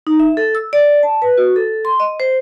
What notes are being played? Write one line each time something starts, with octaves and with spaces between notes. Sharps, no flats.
D#4
E5
A4
E6
D5
A5
B4
F#4
A4
C6
D#5
C5